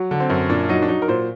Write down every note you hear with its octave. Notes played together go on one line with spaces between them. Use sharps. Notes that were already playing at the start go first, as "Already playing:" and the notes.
Already playing: F#3
D3
C4
F#2
A#2 D4
F#3 D#4
D4
F#3 D#4
A#4
A#2 C5